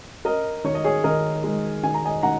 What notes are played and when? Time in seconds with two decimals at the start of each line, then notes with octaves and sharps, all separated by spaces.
0.25 C#4 A#4 D#5
0.64 D#3 C#5
0.75 D#5
0.84 G#4 C#5
1.04 D#3 A#4 D#5
1.44 G#3
1.83 D#3 G#5
1.94 A#5
2.05 D#5 G#5
2.23 D#3 F#5 A#5